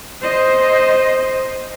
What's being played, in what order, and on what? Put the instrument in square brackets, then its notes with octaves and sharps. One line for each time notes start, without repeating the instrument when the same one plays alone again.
[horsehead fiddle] C5 D#5